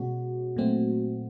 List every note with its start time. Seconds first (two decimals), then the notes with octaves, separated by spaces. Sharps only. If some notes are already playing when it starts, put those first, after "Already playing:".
Already playing: B2 G#3 C#4 F#4
0.56 A#2 F#3 A3 C4